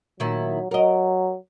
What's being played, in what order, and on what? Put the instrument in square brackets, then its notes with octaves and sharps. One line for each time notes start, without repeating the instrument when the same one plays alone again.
[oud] A#2 D#3 E4 [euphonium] F#3
[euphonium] F#3 [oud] A#4 D#5